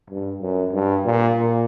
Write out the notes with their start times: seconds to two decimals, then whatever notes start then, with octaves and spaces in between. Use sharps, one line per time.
0.10 G2
0.41 F#2
0.73 G2
1.05 A#2
1.36 A#2